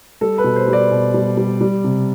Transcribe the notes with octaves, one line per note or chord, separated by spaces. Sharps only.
G3 A4
B4
B2
C5
G3
D5
B2
G3
G3
G3
C3